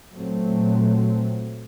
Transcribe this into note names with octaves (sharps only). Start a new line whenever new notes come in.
A#2 F#3 A3 C4